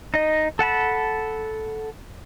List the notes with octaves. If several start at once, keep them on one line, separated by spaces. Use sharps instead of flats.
D#4 D#5
A4 F#5 A5 B5